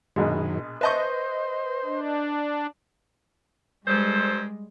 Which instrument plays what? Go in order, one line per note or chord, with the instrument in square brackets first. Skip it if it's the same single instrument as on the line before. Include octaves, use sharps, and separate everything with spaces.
[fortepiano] A#1 B2 G#3 [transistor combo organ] F#2 D#3
[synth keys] B4 D#5 G6 [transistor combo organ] C5 [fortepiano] E5 A5 C#6
[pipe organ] D4
[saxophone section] G2 A4 C5 [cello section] G3 G#3